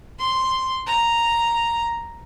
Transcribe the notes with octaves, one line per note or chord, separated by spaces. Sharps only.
C6
A#5